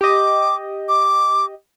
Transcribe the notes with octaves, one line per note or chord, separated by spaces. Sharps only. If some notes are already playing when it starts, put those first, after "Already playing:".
G4 D#5 D6
D6